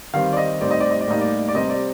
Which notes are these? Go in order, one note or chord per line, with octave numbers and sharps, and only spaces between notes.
D#3 G3 C4 F5
D5
D#5
A2 G3 C4 D#4 D5
D#5
D5
D#5
D5
A2 G3 A#3 D#4 D#5
D5
D5
C3 G3 C4 D#5
D5